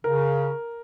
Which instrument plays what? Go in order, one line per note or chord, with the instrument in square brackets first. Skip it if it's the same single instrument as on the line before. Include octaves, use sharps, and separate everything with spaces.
[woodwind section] C#3 [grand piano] A#4